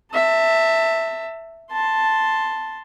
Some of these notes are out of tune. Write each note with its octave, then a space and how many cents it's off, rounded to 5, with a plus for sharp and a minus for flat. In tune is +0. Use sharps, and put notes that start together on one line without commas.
E5 +0 A5 +25
A5 +0 C6 +0